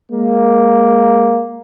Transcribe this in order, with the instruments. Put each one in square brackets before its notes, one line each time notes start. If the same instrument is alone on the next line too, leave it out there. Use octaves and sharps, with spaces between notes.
[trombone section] G#3 A#3